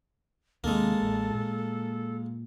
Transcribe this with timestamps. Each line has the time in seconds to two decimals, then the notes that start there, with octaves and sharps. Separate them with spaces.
0.64 D#2 C3 D#3 G#3 A#3 A4
1.02 A1
1.31 A#2